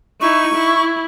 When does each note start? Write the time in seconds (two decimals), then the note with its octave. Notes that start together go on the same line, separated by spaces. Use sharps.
0.21 D#4 E4 C#6
0.55 E4